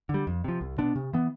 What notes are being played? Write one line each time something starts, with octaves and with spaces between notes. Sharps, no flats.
D3
G3
F2
C3 F3
C2
B2 B3 D4
C3
E3 B3